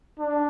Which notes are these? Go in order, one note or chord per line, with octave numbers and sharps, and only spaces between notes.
D4